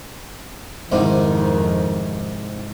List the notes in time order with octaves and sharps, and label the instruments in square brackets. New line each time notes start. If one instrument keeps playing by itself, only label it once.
[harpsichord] C2 G#2 C3 [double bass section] F2 D#3